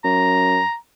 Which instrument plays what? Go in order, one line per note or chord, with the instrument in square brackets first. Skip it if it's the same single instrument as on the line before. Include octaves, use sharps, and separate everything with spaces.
[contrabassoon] F#2 [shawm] A#5